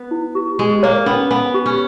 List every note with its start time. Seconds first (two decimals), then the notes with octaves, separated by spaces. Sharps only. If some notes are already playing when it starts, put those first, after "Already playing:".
Already playing: B3
0.11 E4
0.35 G4
0.59 G#3 G4
0.83 A#3 C#5
1.06 B3 C#4
1.31 B3 G#5
1.54 G4
1.66 C#4